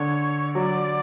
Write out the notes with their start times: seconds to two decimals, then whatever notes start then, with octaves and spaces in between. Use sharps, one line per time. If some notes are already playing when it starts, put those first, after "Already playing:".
Already playing: D3 C#5
0.54 F#3 D5